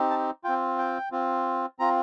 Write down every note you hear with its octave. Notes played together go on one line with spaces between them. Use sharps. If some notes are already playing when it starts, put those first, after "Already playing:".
Already playing: C4 D#4 G4
A5
C4 F4 G5
G5
C4 F4
C4 F4 A#5